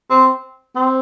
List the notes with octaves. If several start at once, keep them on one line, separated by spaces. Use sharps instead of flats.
C4
C4